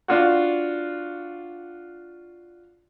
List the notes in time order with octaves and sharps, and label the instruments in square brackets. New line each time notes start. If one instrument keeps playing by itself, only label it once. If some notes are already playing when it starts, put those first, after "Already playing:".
[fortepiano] D4 F4 F#4